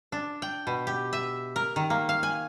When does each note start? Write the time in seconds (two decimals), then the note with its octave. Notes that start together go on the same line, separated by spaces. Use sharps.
0.12 D4
0.42 G5
0.67 B2
0.87 G4
1.13 E5
1.56 A#4
1.76 D#3
1.90 A#3
2.09 F5
2.23 G#5